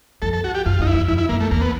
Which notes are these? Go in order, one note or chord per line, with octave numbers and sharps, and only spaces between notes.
F2 A4
A4
F#4
G4
F#2 F4
F#2
D#4
E4
F2
F2 E4
E4
F#2 A#3
A3
E2 A#3
B3